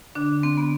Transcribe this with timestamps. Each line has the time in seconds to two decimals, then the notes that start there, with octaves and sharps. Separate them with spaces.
0.15 D3 D4
0.43 C4
0.57 B3